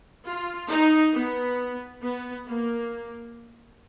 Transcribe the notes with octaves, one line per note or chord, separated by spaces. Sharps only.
F4
D#4
B3
B3
A#3